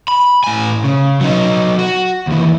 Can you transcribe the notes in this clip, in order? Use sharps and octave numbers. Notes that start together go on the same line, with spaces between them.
B5
A2 G#5
C#3
F#3 D#4
F#4
D#2 E3